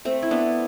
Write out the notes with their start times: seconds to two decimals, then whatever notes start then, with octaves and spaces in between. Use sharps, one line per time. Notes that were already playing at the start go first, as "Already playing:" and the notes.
0.05 A3 C4
0.22 E4
0.31 B3 D4